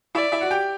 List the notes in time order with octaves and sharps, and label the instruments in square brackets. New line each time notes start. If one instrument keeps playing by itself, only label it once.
[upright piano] E4 E5 [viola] D5
[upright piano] E4 E5
F#4 F#5
G4 G5